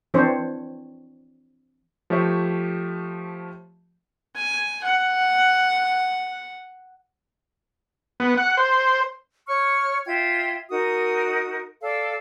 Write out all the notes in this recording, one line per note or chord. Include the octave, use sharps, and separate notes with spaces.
E3 C4 D4 C5 C#5
F3 A3 G4 C#5 E5
G#5
F#5
B3
F#5
C5
C#5 C#6 F6
F4 E5 G5 G#6
D#4 F#4 A#4 D#6
A4 D5 F5